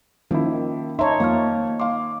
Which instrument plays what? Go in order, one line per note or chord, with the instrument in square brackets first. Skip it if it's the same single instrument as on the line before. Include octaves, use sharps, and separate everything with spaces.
[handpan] D#3 [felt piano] F3 E4 [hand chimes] A#3 C#4
[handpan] D#4 C#5 [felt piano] E5 [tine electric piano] A5 A#5 C6
[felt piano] F2 [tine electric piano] A#3 [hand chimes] F5 A5 F6
[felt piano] F5 C6 [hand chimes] D6